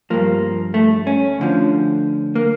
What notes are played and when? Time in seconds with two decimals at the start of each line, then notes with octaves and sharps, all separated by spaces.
0.10 G2 F3 A#3
0.74 A3
1.07 C#4
1.39 D2 D3 F3
2.35 A#3